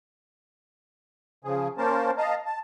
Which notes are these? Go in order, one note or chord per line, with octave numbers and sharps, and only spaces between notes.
C#3 F3 G#4
A#3 C#4 A#4 C5 A5
D#5 F5 A5 A#5
A5